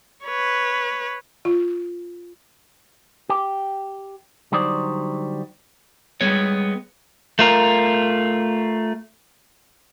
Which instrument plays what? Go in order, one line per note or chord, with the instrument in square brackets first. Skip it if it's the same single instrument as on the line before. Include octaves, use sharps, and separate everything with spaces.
[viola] B4 C#5
[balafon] F4
[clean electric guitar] G4
D3 F#3 G3 D#4 C5 D5
[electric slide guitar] G3 G#3 B3 C#5
[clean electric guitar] A3 F4 A#4